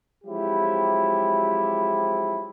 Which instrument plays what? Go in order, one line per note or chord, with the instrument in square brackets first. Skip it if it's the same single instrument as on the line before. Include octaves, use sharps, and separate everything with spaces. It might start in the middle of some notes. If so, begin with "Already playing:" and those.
[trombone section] F3 F#3 G#3 C4 E4 G4